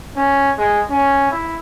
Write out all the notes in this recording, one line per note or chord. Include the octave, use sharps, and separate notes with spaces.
C#4
G#3
C#4
E4